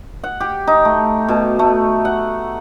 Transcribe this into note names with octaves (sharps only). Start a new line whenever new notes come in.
F#5
G4
D#4
A3
B2
A3
F#5